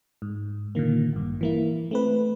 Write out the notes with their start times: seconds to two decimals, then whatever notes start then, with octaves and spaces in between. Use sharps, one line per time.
0.22 G#2
0.75 A#2 D3 D#3 A#3
1.12 A1 G2
1.41 E3 A#3 E4
1.91 A3 C4 B4